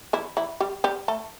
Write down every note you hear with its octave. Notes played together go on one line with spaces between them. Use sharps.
E3 E4
E3 E4
G3 G4
G3 G4
A3 A4